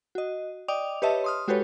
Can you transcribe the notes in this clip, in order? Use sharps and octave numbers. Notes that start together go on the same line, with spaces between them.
F#4 D#5
D5 D#5 G5 D6 D#6 F7
G4 B4 C#5 D#5 E5 A5
C6 D#6 F6
G#3 F#4 G4 A4 B4 C#5